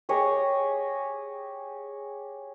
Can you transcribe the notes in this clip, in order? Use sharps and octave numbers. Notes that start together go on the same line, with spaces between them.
G4 G#4 C#5 D#5